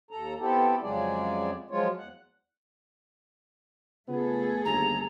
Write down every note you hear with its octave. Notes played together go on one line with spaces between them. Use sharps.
D#2 A4 A#5
B3 C4 E4 G4 A4
F2 C#3 F#3 G#3 G#4 D5
F3 F#3 G#3 F4 C#5
E2 F#5
C#3 A3 B3 F4 G#4 A4
G1 D#2 A#5